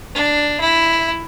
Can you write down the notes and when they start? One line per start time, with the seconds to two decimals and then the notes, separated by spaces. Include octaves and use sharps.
0.15 D4
0.60 E4